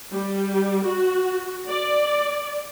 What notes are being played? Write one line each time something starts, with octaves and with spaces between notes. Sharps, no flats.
G3
F#4
D5